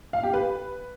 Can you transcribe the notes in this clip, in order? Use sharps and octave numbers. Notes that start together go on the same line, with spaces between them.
F5
G4
B4